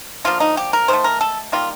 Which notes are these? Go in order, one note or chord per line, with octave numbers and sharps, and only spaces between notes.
D3 F3 A#3 F4
D#4
G4
A#4
D#3 A3 C5
A#4
A4
D#3 G3 A#3 F4